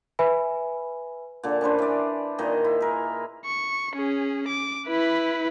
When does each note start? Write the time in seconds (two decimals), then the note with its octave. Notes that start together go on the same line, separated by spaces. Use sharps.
0.19 B4 E5 G#5 B5
1.43 A#2 D3
1.61 C#4 D4 B4 C5
1.79 E3 D5
2.38 A#2 D#3 D#5
2.65 E4
2.81 G#4 A#4
3.46 C#6
3.94 C#4 G#4
4.48 D6
4.88 E4 B4